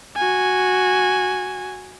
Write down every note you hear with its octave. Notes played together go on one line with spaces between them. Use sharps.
F#4 G#5